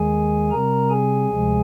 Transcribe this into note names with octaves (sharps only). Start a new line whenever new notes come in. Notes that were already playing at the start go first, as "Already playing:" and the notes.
Already playing: D#2 D#3 G#3 G#4 G#5
C3 G3 C4 A#4 A#5
G#4 G#5
D2 C3 F3 G#3